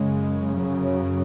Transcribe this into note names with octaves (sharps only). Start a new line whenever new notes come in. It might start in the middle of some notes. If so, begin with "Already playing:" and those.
Already playing: F#2 C#3 G#3
F#3